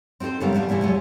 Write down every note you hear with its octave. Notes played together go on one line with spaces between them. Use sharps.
C4 D#4 F#4 A4 C5
F#2 C#3 G3 A3 B3 A#4
F3 A3 D4 F4
C3 E3 G3 A3 E4
E2 F#3 G#3